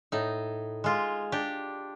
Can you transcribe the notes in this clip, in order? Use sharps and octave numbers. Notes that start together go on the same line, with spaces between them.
A2 D#4
G#3 F4
D4 G4